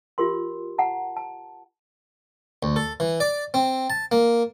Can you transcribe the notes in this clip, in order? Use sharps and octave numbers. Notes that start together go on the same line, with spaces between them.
F4 G4 A#4 C6
F#5 A5 A#5
A5
D2
A4
E3
D5
C4
A5
A#3